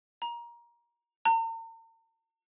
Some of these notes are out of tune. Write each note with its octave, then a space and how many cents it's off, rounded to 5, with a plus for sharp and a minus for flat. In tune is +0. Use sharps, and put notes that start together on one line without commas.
A#5 +20
A#5 -45